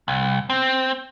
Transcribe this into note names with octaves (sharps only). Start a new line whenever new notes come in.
C2
C4